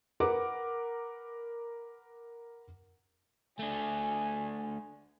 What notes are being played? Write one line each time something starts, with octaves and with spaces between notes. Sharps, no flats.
A#4 B4 F#5 D6
A3 D4 G#5